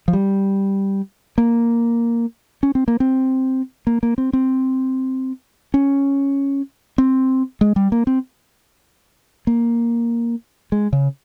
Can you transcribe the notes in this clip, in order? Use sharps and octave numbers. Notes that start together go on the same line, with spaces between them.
F3
G3
A#3
C#4
C4
A#3
C4
A#3
A#3
C4
C4
C#4
C4
G#3
G3
A#3
C4
A#3
G#3
C#3